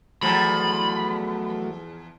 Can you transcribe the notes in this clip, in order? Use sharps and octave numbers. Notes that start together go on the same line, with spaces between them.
E2 F3 F#3 A3 B5